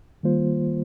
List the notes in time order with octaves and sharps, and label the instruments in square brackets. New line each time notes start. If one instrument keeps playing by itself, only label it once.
[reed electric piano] D#3 G3 A#3 F4 C5